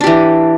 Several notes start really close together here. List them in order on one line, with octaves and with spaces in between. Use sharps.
D4 G4 E3